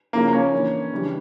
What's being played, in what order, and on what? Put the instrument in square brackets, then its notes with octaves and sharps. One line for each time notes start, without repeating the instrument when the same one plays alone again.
[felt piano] C#3 F3 C#4 E4 [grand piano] A#3
[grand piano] A#3
C#4
[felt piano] E3 A#3 D4
C#3 E3 G3 D4